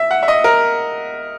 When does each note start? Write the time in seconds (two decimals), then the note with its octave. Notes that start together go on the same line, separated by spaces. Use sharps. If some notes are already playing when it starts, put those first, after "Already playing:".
Already playing: E5
0.11 F#5
0.23 E5
0.28 D#5
0.44 A#4